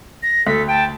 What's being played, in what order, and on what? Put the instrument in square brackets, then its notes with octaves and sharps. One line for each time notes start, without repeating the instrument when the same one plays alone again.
[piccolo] A#6
[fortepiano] D2 [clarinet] A4 [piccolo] B6
[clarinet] G5 [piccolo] A5